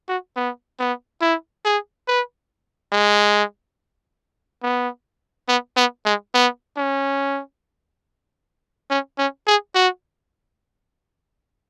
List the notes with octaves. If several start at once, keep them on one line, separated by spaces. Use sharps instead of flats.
F#4
B3
B3
E4
G#4
B4
G#3
B3
B3
B3
G#3
B3
C#4
C#4
C#4
G#4
F#4